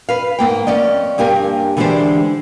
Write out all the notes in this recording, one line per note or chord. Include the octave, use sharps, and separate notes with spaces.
B4 F5
G#2 A#3 G5
F2 C#4 D5 D#5
G2 A#3 G4 A#4 G#5
D3 E3 G#3 D4 G4 C5